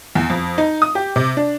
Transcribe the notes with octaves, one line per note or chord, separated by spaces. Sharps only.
E2
F2
D#4
D#6
G4
C3
D4